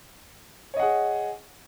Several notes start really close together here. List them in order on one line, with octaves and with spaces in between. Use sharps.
C#5 D#5 F#5 G#4